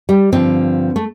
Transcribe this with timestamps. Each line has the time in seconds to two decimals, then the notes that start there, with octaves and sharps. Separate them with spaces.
0.09 G3
0.32 G2 D3 F3 C4
0.96 A3